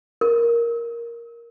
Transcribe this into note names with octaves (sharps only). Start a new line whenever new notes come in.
A#4